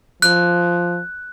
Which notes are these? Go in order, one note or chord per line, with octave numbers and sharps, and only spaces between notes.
F3 F#6